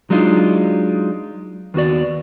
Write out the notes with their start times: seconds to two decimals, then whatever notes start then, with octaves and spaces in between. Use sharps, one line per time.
0.10 F#3 G#3 D4 D#4 F4
1.74 D#2 B3 F#4 D5